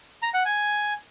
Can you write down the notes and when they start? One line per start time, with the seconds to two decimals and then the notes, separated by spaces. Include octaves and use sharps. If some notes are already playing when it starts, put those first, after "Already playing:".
0.22 A#5
0.34 F#5
0.45 G#5